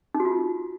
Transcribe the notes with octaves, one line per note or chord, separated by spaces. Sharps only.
D#4
F#4
F4